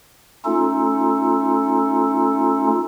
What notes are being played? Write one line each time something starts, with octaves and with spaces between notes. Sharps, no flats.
A3 C#4 D#4 F4 A4